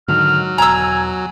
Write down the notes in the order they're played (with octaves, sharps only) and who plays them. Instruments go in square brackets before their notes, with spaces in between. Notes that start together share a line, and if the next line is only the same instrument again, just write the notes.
[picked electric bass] G#2 D3 D#3 [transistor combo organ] F#3 [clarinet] F6
[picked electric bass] E1 [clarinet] G#5 [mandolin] A#5 E6